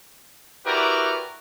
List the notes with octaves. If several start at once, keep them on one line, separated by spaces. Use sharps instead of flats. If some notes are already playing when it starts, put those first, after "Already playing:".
E4 F#4 G4 A#4 B4 D5